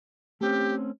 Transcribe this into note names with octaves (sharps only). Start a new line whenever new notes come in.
A3 C4 C#4 G4